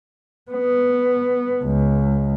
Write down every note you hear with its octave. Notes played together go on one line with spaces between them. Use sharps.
B3
C#2